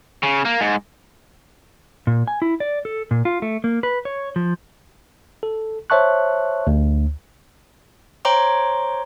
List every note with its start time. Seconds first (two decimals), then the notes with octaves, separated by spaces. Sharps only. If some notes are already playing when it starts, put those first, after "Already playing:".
0.23 C#3
0.45 A#3
0.60 G#2
2.07 A#2
2.28 G#5
2.42 E4
2.60 D5
2.85 A4
3.11 A#2
3.25 F4
3.42 A3
3.64 A#3
3.83 B4
4.05 C#5
4.36 F3
5.43 A4
5.90 C5 C#5 E5 A5 C#6 F#6
6.67 D2
8.25 C5 C#5 G5 A#5 C6 D6